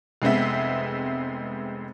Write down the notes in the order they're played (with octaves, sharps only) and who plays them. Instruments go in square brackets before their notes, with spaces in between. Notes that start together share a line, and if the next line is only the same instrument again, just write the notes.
[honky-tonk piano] F1 G#3 B3 C4 E5